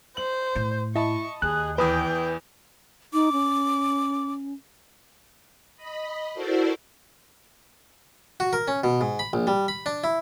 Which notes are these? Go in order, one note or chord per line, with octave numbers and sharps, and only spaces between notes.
C5 F#7
A2
E4 D#5 A5 B5 C#6
D#2 G#4 F#6
E2 E3 B4 G5 D#6
D#4 D6
C#4
D#5 B5
E4 F#4 A4 A#4 C5 D5
F#4
A#4
C#4
B2
G#2
B5
A#1
G3
B5
D4
E4